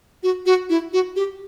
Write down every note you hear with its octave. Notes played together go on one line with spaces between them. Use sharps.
F#4
F#4
E4
F#4
G4